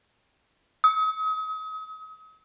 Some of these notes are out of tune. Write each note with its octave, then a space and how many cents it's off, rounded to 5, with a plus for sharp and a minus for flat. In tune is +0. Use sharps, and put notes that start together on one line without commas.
D#6 +40